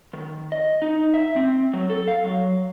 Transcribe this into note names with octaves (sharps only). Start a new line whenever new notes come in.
D#3
D#5
D#4
E5
C4
F#3
A4
F5
F#3